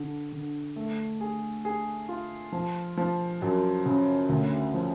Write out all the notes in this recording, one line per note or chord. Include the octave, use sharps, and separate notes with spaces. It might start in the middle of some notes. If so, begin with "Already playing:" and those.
Already playing: D3
D3
A3
G#4
G#4
F4
F3
F3
F#2
C#3
D2
F3